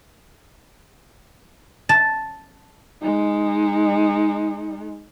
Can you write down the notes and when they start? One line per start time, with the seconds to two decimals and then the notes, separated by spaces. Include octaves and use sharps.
1.89 A5
3.02 G#3 D#4